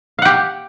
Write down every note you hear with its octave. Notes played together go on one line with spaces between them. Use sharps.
G4 F5 F#5